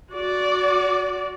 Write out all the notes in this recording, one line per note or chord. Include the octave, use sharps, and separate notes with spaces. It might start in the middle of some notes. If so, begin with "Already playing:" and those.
F#4 D5